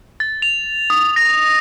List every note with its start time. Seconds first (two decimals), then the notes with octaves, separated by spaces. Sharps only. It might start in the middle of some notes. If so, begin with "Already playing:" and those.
0.20 A6
0.42 F7
0.90 D#6
1.16 A#6